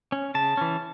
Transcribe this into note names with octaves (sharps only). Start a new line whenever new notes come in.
C#4
C#3 A5
E3 C#4